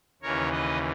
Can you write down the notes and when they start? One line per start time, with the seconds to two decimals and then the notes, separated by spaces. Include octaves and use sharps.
0.22 D#2 C#3 E3 A#4 C#5
0.52 B4 D#5